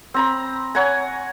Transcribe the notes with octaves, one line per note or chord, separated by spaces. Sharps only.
C4 A#5 B5
C#5 F#5 G#5 A#5